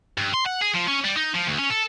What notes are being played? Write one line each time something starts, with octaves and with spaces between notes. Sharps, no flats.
G2
C6
F#5
G#4
F3
C#4
G3
D#4
F3
D2
C#4
A4